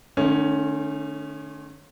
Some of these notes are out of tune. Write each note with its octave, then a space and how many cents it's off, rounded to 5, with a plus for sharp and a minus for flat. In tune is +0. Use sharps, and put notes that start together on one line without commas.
D#3 -45 A3 +0 C#4 +0